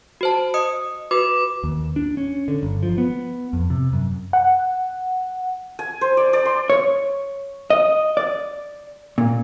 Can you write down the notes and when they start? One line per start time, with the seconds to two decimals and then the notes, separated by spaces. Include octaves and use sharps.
0.21 F#4 C5 A5
0.54 D#5 D#6 C#7
1.11 F#4 B4 D6
1.64 D#2
1.96 D4
2.17 C#4
2.48 D3
2.63 G1
2.83 F3
2.98 B3
3.53 F2
3.70 C3
3.93 F#2
4.33 F#5
5.79 G#5
6.01 C5
6.17 D5
6.33 D5
6.45 C6
6.70 C#5
7.70 D#5
8.17 D5
9.18 A#2